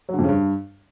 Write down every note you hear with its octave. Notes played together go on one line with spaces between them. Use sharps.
F#3
D3
F2
C#3
G2